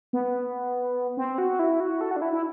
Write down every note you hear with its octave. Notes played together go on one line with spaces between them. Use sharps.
B3
C4
F#4
E4
F#4
A4
F#4
D4
E4
E4